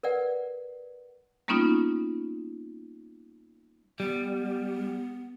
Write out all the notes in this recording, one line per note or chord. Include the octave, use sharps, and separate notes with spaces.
A#4 B4 D5 F#5
G3 A#3 B3 C#4 D#4 F4
G3 B3